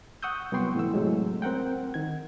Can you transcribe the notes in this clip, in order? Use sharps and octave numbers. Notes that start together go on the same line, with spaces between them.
F#5 C#6 D#6 E6 G6
C2 F#3 B3 G5 C6 C#6
A2 E3 E6
A2 C3 F#3 G#3
C4 A#4 F#5 G5
D#3 G#6